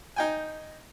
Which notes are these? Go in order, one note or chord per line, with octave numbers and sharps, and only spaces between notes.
D#4 G5 G#5